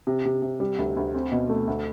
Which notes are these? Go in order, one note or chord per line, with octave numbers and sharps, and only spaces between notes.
C3
C3
C3
G3
D2
D2
C4
B2
A3
D2